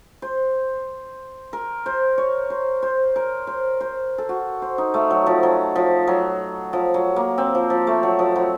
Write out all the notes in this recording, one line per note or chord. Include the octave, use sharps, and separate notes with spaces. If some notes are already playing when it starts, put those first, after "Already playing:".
C5
A#4
C5
C#5
C5
C5
A#4
C5
C5
A4
F#4
C5
D#4
A3
F#3
F3
F#3
F3
F#3
F3
F#3
A#3
C4
F3
F3
A3
F#3
F3
F#3